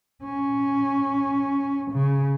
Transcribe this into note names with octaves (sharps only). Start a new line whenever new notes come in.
C#4
C#3